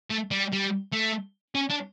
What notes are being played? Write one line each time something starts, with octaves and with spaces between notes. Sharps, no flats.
A3
G3
G3
A3
C#4
D4